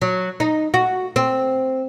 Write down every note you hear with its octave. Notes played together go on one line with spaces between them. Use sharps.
F#3
D#4
F#4
C4